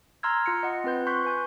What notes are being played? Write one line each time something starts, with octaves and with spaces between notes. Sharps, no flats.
A#5 C6 E6 F6 G#6
F4 C#7
D#5 F#5
C4 F4 B4 G6
C6 C#6 F#6 G6 B6
B4 G#5 G6